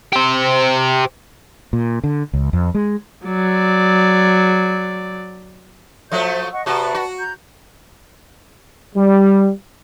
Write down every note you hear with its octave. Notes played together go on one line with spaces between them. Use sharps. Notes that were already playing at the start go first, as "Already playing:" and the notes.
G4 C5
A#2
D3
C#2
F2
G#3
F#3 D5
F3 F#3 A3 C5 E5 G6
D#5 F#5 C#6
C3 F#4 B4 D5 A5
F#4
A#5 G6
G3